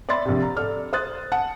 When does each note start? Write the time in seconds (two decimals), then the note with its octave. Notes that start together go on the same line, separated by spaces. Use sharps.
0.09 D5 E5 B5 C6 A6
0.25 A#1 C3
0.42 A#5
0.56 A4 D5 F6
0.93 C5 D#6 F#6 A6
1.32 F#5 A5 C#7